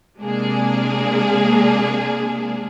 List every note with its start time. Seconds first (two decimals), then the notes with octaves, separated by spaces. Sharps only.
0.20 C3 G#3 A#3 D4 G#4